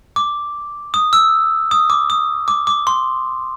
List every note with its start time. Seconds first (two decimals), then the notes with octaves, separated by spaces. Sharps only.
0.16 D6
0.94 D#6
1.13 E6
1.71 D#6
1.90 D6
2.10 D#6
2.48 D6
2.67 D6
2.87 C6